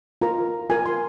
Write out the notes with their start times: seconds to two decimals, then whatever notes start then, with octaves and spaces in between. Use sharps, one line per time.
0.22 F4 A#4 A#5
0.70 F4 A#4 G#5
0.86 C6